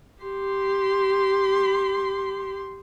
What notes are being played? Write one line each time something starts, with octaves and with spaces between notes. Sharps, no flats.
G4 C6